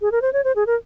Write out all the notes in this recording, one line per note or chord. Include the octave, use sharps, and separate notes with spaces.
G#4
A#4
C5
C#5
C5
G#4
A#4